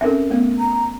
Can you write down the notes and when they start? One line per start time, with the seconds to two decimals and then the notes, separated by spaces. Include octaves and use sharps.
0.01 C4 C#4 A4 A#4 E5
0.30 A3 B3
0.59 A#5